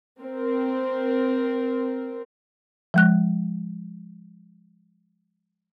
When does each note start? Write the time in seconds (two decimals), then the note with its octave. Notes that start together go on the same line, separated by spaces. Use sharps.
0.20 C4 A#4
2.94 F3 G#3 F#6